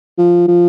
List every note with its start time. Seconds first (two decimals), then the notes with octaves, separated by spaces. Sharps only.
0.18 F3
0.48 F3